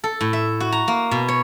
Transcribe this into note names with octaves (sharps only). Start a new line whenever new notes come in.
A4
A2
E5
F#4
A#5
A#3
B2
C#5